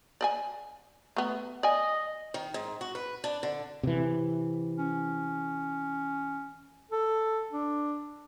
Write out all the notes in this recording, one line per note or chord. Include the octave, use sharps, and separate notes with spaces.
D5 D#5 G#5
A3 B3
D5 D#5 G#5
D#3
G#2
F#4
B4
D4
D3
C3 E3
C#4
A4
D4